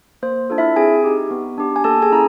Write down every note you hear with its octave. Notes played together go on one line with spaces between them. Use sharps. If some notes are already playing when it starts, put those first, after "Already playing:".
A#3 C5
D4 F4 A4
E4 E5
C4 G#4 G#5
D#4 G4
B3
D4 G4
G#5
A#3 A4 A5
G#4 G#5
C#4 E4 A#5